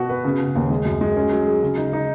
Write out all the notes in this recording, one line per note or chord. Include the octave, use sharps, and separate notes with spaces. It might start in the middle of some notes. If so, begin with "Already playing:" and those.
Already playing: B2 F#4
B4
C#3
C#3
D#2
G#3
F#2
G#3
C#4
F#3
G#4
C#3
D#4
D#4